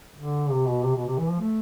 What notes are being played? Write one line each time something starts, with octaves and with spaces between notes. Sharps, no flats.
D3
C3
B2
C3
B2
C3
E3
F3
A3